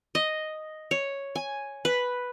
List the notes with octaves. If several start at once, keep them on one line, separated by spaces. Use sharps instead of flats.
D#5
C#5
G#5
B4